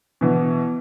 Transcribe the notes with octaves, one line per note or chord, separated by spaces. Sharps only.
B2 E3 B3